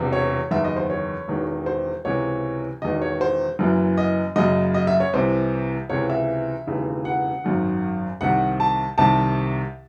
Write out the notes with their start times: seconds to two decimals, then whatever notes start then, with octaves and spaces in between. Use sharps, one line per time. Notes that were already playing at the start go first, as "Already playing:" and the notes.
Already playing: E1 E2 C3
0.13 C#5
0.51 F#1 E2 D#3 E5
0.64 D#5
0.76 C5
0.90 C#5
1.28 E1 E2 D#3
1.66 C5
2.05 C#2 C3 E3 C#5
2.82 E1 E2 D#3 D#5
3.02 C#5
3.21 C5
3.59 F#1 F#2 E3
3.98 D#5
4.36 F#1 F#2 C#3 D#5
4.74 D#5
4.87 E5
5.00 C#5
5.13 C2 C3 E3 C5
5.89 C#2 C3 E3 C#5
6.10 E5
6.67 E1 D#2 C#3 E3
7.05 F#5
7.44 G#1 F#2 D#3
8.21 C2 C3 D#3 F#5
8.60 A5
8.98 C2 C3 D#3 A5